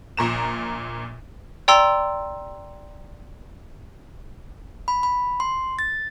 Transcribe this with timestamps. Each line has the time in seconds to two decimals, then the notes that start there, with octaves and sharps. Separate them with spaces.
0.17 A#1 A#2 A#5 E7
1.68 D5 G5 A#5 C6 E6
4.88 B5
5.03 B5
5.40 C6
5.79 A6